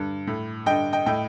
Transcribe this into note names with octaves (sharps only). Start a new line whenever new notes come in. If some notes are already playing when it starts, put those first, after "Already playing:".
Already playing: G2 D3
A2
G2 D3 D#5 G5
D#5 G5
A2 D#5 G5